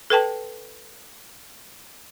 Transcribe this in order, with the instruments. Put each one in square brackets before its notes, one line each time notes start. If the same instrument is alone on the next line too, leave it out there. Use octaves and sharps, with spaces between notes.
[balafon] A4 B4 G5 A5